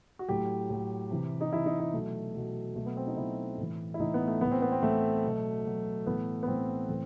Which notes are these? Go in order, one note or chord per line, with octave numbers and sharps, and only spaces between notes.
F#4
A2 F#3 G4
A2 F#3
C3 E3
D#4
C3 E3 E4
D#4
E4
B2 F#3 A3
B2 F#3
B2 F#3 A3
B3
C4
D#4
B2 F#3 E4
A2 E3
E4
A2 E3 D#4
B3
A3
A2 E3 B3
C4
B3
C4
A2 E3 A3
B2 F#3
B2 F#3
A2 E3 B3
B3
A2 E3 C4
A2 E3